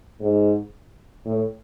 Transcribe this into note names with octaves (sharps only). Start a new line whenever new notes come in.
G#2
A2